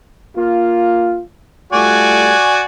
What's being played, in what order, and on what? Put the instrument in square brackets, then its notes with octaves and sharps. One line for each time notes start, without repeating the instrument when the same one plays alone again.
[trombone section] A#3 F4
[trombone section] G3 A3 F4 [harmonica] F#4 D5 G#5